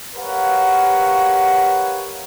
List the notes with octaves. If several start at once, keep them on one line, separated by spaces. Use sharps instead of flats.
G4 A#4 B4 C#5 F5 F#5